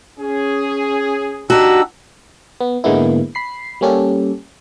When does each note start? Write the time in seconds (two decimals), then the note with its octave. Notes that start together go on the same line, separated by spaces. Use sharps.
0.18 C#4 G#4
1.50 D4 D#4 F#4 G4 E6
2.61 B3
2.84 G#2 D3 G#3 A#3 B3 E4
3.35 B5 C7
3.81 G3 A#3 C#4 G4 A4